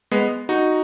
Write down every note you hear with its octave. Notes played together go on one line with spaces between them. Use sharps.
G#3 B3
D#4 F#4